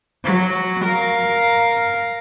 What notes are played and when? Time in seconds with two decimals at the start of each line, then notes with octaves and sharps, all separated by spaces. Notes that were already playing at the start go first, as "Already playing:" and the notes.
0.24 F#3
0.85 A#4 F5